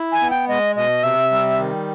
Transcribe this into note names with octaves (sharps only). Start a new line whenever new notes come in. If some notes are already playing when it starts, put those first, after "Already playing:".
Already playing: E4
G#5
B3
G5
G#3 D#5
B2 D#5
C3 E5
G3
D#3